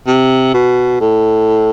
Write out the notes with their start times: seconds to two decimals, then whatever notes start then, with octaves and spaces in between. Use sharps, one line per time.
0.07 C3
0.54 B2
1.00 A2